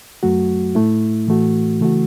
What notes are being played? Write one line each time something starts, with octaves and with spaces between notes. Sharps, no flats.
F#2 F#3 A3 F#4
A2 A3 E4
A2 E3 A3 F#4
C#3 E3 A3 F#4